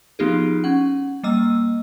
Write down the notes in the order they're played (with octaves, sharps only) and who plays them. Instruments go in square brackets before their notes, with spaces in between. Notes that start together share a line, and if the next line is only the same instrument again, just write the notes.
[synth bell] F3 B3 D#4 F4 G4 G#4
C#4 F#5
G3 A#3 D#5 E6